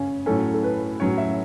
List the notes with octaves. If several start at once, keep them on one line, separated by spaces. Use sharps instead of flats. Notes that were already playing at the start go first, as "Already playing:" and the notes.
Already playing: C#3 C#4
A2 F#3 C#4 A4
A4
B4
A2 F#3 C#4 C#5
E5